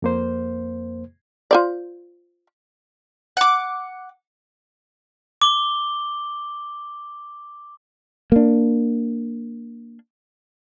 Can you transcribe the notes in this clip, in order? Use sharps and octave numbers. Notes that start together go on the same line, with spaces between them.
F2 A#3 C5
F4 C5 D5
F#5 D6
D6 G7
A#3 D4